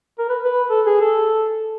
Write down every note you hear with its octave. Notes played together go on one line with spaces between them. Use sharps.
A#4
B4
B4
A4
G#4
A4